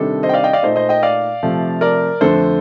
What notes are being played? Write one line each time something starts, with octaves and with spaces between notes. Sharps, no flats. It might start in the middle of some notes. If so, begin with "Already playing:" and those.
Already playing: C3 D#3 G3 D4 A4
C5 D#5
G5
D5 F5
D#5 G5
D5 F5
A#2 A3 D#4 C5 D#5
C5 D#5
D#5 G5
D5 F5
C3 F3 A3
A#4 D5
F2 D3 A3 A4 C5